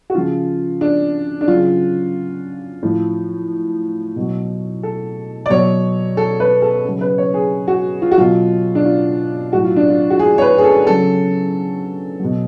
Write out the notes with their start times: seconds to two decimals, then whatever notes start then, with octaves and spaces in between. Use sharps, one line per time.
0.10 F#4
0.14 C#3 F3 F4
0.81 D4
1.41 D4
1.48 C#3 F#3 F4
2.83 A2 F3
4.16 B2 F#3
4.83 A4
5.46 D5
5.50 B2 F#3 C#5
6.17 A4
6.40 B4
6.62 A4
6.84 C#3 F#3
7.01 B4
7.18 C#5
7.34 G#4
7.68 F#4
8.02 F4
8.12 F#4
8.18 B2 F#3 F4
8.75 D4
8.85 F4
9.53 A2 F#3 F#4
9.64 F4
9.76 D4
9.89 F4
10.10 F#4
10.19 G#4
10.38 C#5
10.42 B4
10.58 G#4
10.64 A4
10.86 C#3 F#3 A4
12.20 B2 F#3